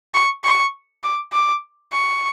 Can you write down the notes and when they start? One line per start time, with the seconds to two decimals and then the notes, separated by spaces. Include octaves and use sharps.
0.14 C#6
0.44 C#6
1.03 D6
1.33 D6
1.92 C#6